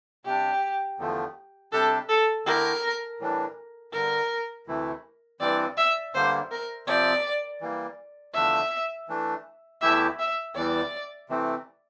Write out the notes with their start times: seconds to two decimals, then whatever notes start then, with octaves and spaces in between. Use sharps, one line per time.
0.25 C3 G3 D4 G4
0.98 E2 D3 F3 A3
1.72 C3 G3 D4 G4 A4
2.09 A4
2.45 D3 A3 E4 G4 A#4
3.20 A2 E3 G3 D4
3.93 G2 D3 G3 A#4
4.67 D2 C3 E3 A3 E4
5.40 G2 E3 G3 C4 D5
5.77 E5
6.14 G2 D3 G3 A#3 C5
6.51 A#4
6.87 C3 F3 C4 G4 D5
7.61 E3 G3 A#3
8.34 E2 D3 F3 A3 D4 E5
9.08 E3 A3 D4
9.82 E2 E3 A3 E4 G4 E5
10.19 E5
10.55 E2 E3 G3 D5
11.29 C3 E3 A3 C4